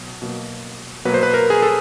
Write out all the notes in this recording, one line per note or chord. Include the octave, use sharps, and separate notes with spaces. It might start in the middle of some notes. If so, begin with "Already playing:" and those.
Already playing: B2 F#3
B2 F#3 A#3
B2 F#3 A#3 B4
C5
B4
A#4
G#4
A4